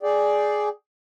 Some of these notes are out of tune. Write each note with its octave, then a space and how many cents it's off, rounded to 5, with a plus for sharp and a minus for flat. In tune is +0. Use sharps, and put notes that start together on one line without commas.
G#4 +10 D5 +0 G5 -5